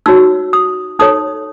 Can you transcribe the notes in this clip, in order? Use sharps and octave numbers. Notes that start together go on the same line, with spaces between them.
D#4 F#4 C#5 E6
D#6
D#4 A4 C#5 D#6